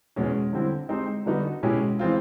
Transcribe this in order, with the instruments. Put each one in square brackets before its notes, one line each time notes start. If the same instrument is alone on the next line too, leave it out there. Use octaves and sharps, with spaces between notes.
[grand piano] E2 B2 G#3 C#4
D3 G3 C4 E4
G#3 C4 D#4 G4 C5
D3 G3 B3 D#4 F#4
B2 G#3 C#4 E4 G4
E3 G#3 C4 F4